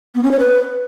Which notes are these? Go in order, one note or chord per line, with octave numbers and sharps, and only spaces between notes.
B3
C#4
C#5
B4